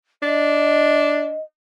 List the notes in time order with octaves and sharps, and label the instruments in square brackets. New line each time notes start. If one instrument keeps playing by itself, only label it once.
[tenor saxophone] D4 [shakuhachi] D#5